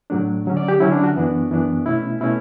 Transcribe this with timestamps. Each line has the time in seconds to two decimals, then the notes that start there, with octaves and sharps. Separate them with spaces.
0.10 A2 F#3 A3 D4
0.46 D3 F#3 C#4
0.57 D5
0.68 G4
0.80 D3 F#3 C#4 E4
0.92 D4
1.04 F#4
1.16 F#2 E3 B3 D4
1.51 F#2 E3 B3 D4
1.86 B2 A3 C#4 E4
2.20 B2 A3 C#4 E4